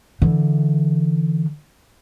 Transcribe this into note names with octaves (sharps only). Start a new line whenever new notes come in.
D3 E3